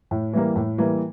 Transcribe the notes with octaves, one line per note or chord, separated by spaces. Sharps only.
A2
E3 G3 A#3
A2
E3 G3 A#3